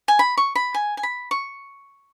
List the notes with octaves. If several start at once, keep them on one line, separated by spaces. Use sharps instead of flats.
G#5
B5
C#6
B5
G#5
G#5
B5
C#6